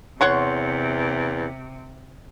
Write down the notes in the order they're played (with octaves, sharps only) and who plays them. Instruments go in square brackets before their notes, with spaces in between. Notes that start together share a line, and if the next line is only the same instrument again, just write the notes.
[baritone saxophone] E2 [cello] C3 [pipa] C#5 F#5 C6